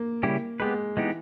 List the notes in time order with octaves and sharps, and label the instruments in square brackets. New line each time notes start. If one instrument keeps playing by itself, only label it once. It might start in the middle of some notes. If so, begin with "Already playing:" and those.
Already playing: [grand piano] A#3
[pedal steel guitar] C#3 G3 C#4 E4 G4
[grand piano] G#3 [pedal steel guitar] B3 G4 B4
[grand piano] E3 [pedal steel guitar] G#3 B3 D#4 G4